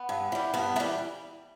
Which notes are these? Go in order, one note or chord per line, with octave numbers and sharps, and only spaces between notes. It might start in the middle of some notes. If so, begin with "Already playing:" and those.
Already playing: B3
G2
E3 G3
G2 B3
E3 G3 A3